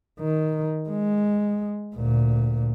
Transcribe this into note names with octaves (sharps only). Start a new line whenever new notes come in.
D#3
G#3
D2 A#2